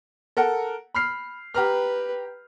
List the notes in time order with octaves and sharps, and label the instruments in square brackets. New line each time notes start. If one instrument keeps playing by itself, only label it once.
[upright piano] A4 A#4 F#5
B5 F6 C7
[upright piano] G4 A#5 F6 [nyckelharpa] B4